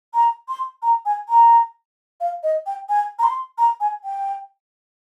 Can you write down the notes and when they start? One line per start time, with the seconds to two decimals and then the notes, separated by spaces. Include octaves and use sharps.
0.14 A#5
0.49 C6
0.82 A#5
1.06 G#5
1.29 A#5
2.21 F5
2.43 D#5
2.66 G5
2.89 G#5
3.19 A#5
3.23 C6
3.58 A#5
3.80 G#5
4.04 G5